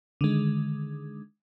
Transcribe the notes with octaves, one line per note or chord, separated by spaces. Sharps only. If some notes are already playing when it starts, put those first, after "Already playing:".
D3 D#3 G#3